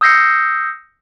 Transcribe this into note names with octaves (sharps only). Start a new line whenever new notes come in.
D#6 E6 G6 A#6 C7 C#7